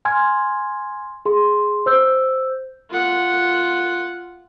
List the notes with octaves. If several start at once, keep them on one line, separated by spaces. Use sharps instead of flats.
G#5 C6 F6 G#6
G#4 C6
C5 E6 G6
F4 F#5